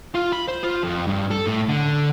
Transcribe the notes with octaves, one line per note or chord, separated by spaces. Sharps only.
F4
B5
C5
F4
F2
G2
A4
A2
D3